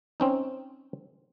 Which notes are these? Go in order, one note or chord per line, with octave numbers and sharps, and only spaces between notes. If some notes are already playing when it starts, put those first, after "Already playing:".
C4 C#4 D#4